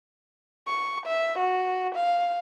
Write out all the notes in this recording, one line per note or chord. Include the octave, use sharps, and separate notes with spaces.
C#6
E5
F#4
F5